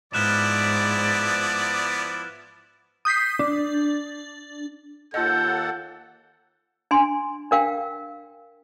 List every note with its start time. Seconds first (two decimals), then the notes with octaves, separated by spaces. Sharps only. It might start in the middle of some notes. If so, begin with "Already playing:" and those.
0.14 G#2 F3 B3 E4 D5 F6 F#6 E7
3.05 D#6 G6 B6 C7
3.39 D4
5.14 D#2 F4 A4 D#5 F#5 G6
6.91 D4 G#5 C6
7.51 D4 A#4 F5 G5